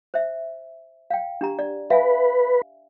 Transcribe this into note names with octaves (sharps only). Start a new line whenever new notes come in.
C5 E5
F5 G5
D4 G4 A#5
D5
B4 E5 F5 G#5